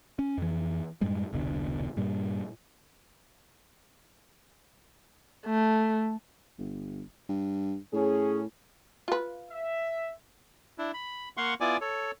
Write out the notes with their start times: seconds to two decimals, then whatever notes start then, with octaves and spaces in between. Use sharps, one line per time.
0.19 C#4
0.38 F2 E3
1.01 F#2 A2 G3 G#3
1.33 E1 C2 B2 D3
1.97 G2 A#2 G3
5.46 A3
6.58 G1
7.29 G2
7.93 A2 C#4 G#4
9.08 F4 B4
9.51 E5
10.78 D4 E4
10.94 B5
11.37 A#3 F5 F#5 C6 C#6
11.61 B3 E4 F4 D5 G#5 D6
11.81 A4 C#5